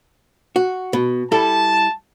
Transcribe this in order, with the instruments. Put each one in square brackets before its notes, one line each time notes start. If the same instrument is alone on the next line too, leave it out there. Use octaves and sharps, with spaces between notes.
[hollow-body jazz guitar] F#4
B2
[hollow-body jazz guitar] G3 E4 A4 [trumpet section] A5